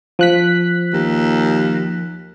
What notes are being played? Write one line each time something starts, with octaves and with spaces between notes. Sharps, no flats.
F3 F#6 B6
D#2